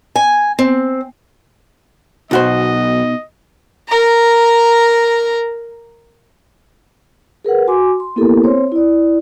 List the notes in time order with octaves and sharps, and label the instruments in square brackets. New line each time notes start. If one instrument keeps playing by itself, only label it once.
[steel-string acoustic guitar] G#5
C4
[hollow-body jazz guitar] B1 F#4 C5 [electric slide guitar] B2 D#4 [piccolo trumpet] D#5
[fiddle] A#4 A#5
[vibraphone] G#4 A#4 B4 F#5
F#4 G#5 C6 D6
C6
A#3 B3 E4 G4 A4 A#4
C4 C5 C#5 C6
E4 D5